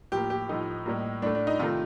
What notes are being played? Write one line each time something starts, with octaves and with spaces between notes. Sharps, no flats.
A2 F3 A#3 G4
G4
A2 F3 A3 D#4
A2 G3 A#3
A2 A3 D4
D4
D#4
C3 D#3 A3 F4